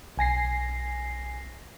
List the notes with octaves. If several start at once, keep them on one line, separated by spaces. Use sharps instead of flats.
B1 G#5 A#6 C7